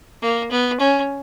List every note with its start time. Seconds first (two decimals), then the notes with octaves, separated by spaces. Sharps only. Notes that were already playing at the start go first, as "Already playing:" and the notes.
0.22 A#3
0.51 B3
0.80 C#4